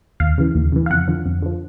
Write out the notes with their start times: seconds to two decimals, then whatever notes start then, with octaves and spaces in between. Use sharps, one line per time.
0.20 D#2 F5
0.38 C#3 E3
0.55 D#2
0.72 C#3 E3
0.86 F5
0.90 F2 F#5
1.08 D3 F3
1.26 F2
1.42 D3 F3